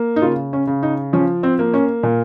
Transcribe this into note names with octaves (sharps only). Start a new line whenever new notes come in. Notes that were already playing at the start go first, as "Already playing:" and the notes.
Already playing: A#3
D#4
C#3 F4
C#4
C#3
D#4
F3 C#4
C4
A#3
C#4
A#2